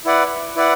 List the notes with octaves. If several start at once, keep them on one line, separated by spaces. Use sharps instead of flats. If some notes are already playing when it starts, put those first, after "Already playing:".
E4 B4 D5 F#5
E4 B4 D5 F#5